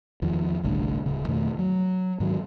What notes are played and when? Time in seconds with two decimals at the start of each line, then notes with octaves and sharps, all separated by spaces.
0.22 E2 D#3 F3
0.64 G1 C2 A2 D3
1.06 D1 C#3
1.28 F2 B2 D#3 A3
1.59 F#3
2.20 G#2 D#3 F#3